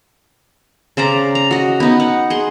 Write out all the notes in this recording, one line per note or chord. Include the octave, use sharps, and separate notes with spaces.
C#3 C5 D5 A#5
A#5
F#4 D#5
B3 D#4
F#5
G#4 C6